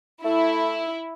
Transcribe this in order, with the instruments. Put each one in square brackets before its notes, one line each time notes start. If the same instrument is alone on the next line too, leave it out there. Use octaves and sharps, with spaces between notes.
[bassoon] A3 [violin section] E4